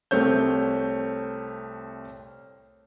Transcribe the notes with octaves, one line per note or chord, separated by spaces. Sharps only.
C2 A3 C4 C#5 G6